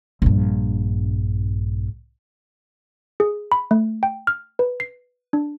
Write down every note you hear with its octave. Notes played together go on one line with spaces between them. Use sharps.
A#1 G2
G#4
B5
A3
G5
F6
B4
C7
D4